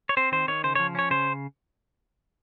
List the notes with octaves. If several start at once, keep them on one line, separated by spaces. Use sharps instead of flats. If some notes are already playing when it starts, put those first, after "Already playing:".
C#5
C4 C5
D#3 C5
D#3 C#5
C#3 C5
F3 C#5
C#4 C#5
C#3 C5